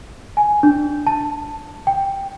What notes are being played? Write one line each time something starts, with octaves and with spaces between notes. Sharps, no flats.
G#5
D4
A5
G5